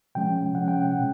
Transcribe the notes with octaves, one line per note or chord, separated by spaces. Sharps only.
C3 F3 G#3 C#4 G5
C3 F3 G#3 C#4 F#5
G5
F#5
B2 G#3 C#4